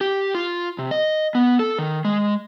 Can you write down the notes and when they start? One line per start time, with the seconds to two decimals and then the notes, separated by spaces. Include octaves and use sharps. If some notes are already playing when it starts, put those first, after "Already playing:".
0.01 G4
0.35 F4
0.79 C3
0.91 D#5
1.35 B3
1.59 A4
1.79 D#3
2.05 G#3